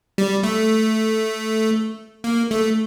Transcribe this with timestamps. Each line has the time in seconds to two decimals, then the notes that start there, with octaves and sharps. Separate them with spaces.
0.18 G3
0.43 A3
2.24 A#3
2.51 A3